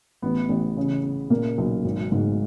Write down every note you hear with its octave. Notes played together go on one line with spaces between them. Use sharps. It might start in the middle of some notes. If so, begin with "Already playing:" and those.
A1 B3
A1
C#3
C#3
A#2 A#3
B1
G#1
G#2